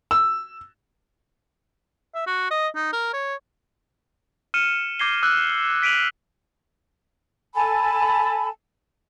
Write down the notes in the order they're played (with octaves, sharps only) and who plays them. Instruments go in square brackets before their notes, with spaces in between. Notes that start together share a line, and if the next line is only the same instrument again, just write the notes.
[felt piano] E6
[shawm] E5
F#4
D#5
D#4
A#4
C#5
[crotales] F6 C#7 D#7 E7
D6 G6 G#6 A#6 C7 G7
D6 E6 F#6
B6 D7 D#7 F7 F#7
[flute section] A4 G#5 A5 B5